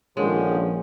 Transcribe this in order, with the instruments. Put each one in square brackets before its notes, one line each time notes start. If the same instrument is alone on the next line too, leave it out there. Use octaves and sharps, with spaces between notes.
[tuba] A#1 [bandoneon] D3 D#3 F3 [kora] G#3 [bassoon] C#4